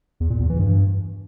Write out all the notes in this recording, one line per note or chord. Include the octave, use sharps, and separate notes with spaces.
E2
A#2
E2
E3
G2